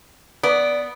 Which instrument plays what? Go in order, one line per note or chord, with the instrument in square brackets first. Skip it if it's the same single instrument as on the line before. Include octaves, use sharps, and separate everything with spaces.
[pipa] B3 [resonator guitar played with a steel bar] D5